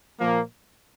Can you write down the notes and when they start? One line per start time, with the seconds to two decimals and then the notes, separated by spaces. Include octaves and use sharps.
0.18 A#2 F3 A#3